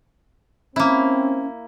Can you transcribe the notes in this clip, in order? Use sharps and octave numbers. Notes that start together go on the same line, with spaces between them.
A#3 C4 C#4 E4